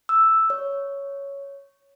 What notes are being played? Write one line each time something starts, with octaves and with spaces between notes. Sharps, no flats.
E6
C#5